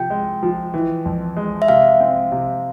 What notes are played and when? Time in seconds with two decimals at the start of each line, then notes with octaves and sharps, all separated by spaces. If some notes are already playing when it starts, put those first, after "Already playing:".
Already playing: C3 F3 G5
0.10 G#3
0.43 F3
0.74 E3
1.05 F2
1.36 G#3
1.62 E5
1.68 C3 F5
2.00 C4
2.32 C3